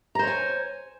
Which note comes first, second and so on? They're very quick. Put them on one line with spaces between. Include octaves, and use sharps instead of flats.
A#5 C5 C#5 G#5